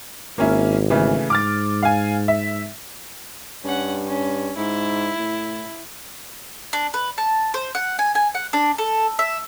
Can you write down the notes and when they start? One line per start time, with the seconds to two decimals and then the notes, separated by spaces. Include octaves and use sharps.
0.38 G#1 A#3 C#4 E4
0.90 C#3 E3 A3
1.30 G#2 D6 F6 A6
1.83 F5 G#5
2.28 E5
3.64 G2 C#4 F#5
4.07 C#4
4.57 G#2 E4
5.19 A2
6.73 D4
6.94 B4
7.18 A5
7.54 C5
7.75 F#5
7.99 G#5
8.15 G#5
8.34 F#5
8.53 D4
8.78 A4
9.19 E5